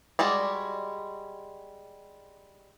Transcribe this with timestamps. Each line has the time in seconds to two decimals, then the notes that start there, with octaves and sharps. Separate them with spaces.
0.19 G3 G#3 F#4 D5